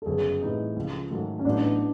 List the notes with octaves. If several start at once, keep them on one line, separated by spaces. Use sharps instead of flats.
A4
G1 F#2 C#3 F#3 G#4
A2 E3 G3 C4 D#4
C#2 C#3 F3
G#2 D#3 F#3 A3
C#4
A1 A2 F#3 B3 D4 D#4